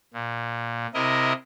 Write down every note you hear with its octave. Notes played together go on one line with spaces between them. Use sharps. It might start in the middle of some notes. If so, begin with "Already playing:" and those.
A#2
C3 E4 A#4 D#5